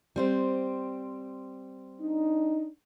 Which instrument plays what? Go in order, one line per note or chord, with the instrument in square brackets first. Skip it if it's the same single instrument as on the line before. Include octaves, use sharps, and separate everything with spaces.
[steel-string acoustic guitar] G3 C4 C5
[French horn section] D4 D#4